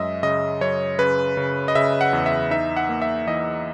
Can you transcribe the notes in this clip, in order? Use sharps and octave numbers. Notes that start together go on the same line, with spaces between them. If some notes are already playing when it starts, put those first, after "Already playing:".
Already playing: F#2 G#3 D#5 E5
C#3 D#5
F#2 C#5
C#3 B4
C#3
D#5
C#3 E5
F#5
E2
E5
D#4 E5
F#5
A#3
E5
E3 D#5